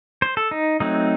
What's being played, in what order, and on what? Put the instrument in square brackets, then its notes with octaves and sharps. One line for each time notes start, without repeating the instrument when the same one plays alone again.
[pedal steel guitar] C5
A4
D#4
F#3 A3 C4 D#4